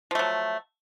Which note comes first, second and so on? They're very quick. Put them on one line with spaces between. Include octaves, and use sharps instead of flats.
F3 A3 F#3